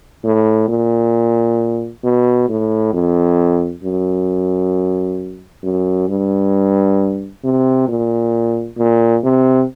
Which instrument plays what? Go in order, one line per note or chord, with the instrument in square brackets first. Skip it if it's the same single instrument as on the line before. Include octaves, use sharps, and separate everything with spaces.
[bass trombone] A2
A#2
B2
A2
F2
F#2
F#2
G2
C3
A#2
A#2
C3